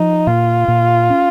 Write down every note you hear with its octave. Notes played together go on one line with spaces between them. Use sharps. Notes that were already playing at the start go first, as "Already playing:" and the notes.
Already playing: F3 D#4
A#2 F4
A#2
C#4